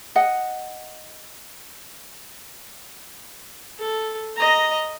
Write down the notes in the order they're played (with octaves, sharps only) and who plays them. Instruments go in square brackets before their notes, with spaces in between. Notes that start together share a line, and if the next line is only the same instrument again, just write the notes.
[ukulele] D#5 F#5
[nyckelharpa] A4
D#5 A#5